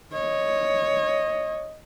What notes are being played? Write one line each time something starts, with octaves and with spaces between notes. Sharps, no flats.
C#5 D#5